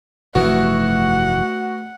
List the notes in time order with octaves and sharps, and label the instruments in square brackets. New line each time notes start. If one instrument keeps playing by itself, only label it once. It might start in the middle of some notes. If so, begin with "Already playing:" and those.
[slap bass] F1 G2 E3 [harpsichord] A3 B3 [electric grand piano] F#4 [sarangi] F#5